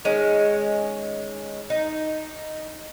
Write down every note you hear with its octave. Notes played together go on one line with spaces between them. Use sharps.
D#3 G#3 C#4
D#4